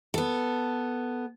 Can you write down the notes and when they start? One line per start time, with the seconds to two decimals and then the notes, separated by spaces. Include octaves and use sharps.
0.14 B3 A4